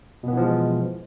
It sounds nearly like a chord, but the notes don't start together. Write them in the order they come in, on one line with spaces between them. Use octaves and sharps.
B2 B3 E3 F3 G#3